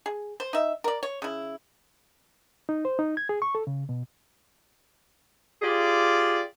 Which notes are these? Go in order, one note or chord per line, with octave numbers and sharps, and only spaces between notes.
G#4
C5
D#4 E5
A#4 D5
C#5
C#3 E4
D#4
C5
D#4
G#6
G#4
C#6
A4
C#3
B2
F4 G4 G#4 D5